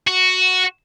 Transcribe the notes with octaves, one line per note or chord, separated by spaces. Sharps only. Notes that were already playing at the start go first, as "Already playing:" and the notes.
F#4